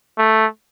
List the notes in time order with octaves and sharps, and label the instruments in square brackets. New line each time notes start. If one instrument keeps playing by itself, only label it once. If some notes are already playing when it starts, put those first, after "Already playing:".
[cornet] A3